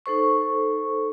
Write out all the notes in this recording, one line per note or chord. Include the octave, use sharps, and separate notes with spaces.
D#4 A4 C5 C#6